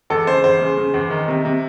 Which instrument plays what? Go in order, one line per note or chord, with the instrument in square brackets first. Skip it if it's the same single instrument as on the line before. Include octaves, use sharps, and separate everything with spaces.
[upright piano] E2 [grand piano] A4
[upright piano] C#3 [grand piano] C5
[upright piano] E2 [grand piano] C5
[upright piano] C#3
C#3
E2
D#3
C3
C3